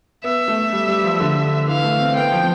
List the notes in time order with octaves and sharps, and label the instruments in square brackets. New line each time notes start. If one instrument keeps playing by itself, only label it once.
[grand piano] B3 [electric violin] E5
[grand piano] A3
G3
G3
F3
D3
[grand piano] E3 [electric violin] F5
[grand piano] A3
C4
[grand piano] B3 [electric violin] G5
[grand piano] F3